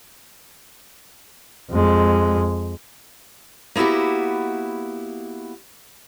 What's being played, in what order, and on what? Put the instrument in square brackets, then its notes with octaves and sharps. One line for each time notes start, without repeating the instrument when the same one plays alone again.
[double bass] F2 G#3
[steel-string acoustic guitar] A#3 B3 E4 F#4 G4